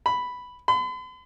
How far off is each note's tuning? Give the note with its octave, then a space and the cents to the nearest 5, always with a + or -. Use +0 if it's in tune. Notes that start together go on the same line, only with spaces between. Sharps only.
B5 +0
B5 +45